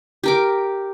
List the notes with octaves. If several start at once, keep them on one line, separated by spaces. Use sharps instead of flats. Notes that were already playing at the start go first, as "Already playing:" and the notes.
G4 A#4 D6